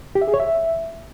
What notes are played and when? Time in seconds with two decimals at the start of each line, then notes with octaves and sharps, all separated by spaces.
0.15 G4
0.21 E5
0.28 G#4
0.34 C#5
0.40 E5